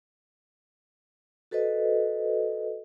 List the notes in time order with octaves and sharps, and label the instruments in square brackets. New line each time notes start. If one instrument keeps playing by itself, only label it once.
[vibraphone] F#4 A4 B4 C5 D#5